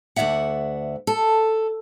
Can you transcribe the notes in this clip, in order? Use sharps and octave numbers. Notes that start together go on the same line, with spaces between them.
D2 G#2 D5 E5 F#5
A4